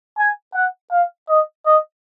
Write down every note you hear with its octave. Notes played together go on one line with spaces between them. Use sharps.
G#5
F#5
F5
D#5
D#5